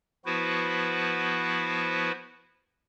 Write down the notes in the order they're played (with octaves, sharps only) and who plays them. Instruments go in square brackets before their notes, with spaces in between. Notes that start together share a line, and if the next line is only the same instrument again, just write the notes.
[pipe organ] F3 B3 E4 F#4 B4 C5